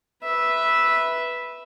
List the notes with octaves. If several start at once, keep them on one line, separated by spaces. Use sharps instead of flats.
B4 E5